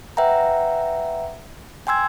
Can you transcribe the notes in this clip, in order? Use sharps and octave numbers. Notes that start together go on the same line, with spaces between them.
B4 E5 F#5 G5 A#5
G5 G#5 C6 E6 G#6